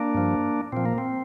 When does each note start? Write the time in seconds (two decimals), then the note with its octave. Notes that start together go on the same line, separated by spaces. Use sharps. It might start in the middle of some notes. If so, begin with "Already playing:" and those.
Already playing: A#3 D4
0.15 G2 F3
0.72 A#2 F3 C4
0.86 A#3
0.98 C4